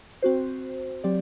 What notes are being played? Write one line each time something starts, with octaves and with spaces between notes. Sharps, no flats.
C4 F#4 C5
F#3 C4 G4 D5